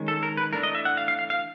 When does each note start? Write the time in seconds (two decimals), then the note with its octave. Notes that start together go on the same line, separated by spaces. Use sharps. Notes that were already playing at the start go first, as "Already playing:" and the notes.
Already playing: D#3 G#3 C#4
0.08 A4
0.23 A#4
0.37 B4
0.52 E3 A3 D4 A#4
0.63 D#5
0.75 E5
0.85 F#5
0.97 F5
1.08 F5
1.19 F5
1.30 F5